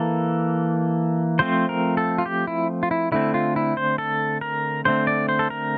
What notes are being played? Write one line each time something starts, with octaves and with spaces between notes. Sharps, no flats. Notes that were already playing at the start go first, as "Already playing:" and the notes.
Already playing: E3 A#3 A4
F3 A3 C4 C5
A#4
A4
F4
G4
E4
F4
E4
D3 A3 C4 E4
F4
E4
C5
A4
A#4
D3 A3 C4 C5
D5
C5
A4
A#4